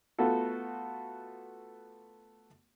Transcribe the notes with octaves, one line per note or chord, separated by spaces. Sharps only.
A3 B3 F4 F#4 A4